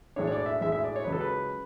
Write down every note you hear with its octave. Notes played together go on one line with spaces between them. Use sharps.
B1 A2 G#3 D4 C#5
C#5
D5
E5
B1 A2 G#3 D4 E5
E5
D5
C#5
C#2 C#3 F#3 C#4 B4
A4
B4